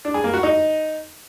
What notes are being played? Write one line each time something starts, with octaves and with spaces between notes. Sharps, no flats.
D4
G#4
A#3
F#4
D#4